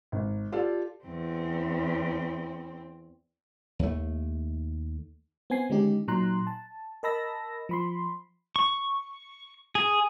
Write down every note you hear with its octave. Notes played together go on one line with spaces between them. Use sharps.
G#1
F4 G4 A4 D5 F5
E2 C4
D#2 A3
B3 C4 G#5 C7
D3 D#3 G#3 C#4 D#4 G4
A#2 F#3 D#4 A#5 C6 F#6
A5
A#4 D#5 A5 B5 E6 A#6
F3 B5 C6
C#6
G#4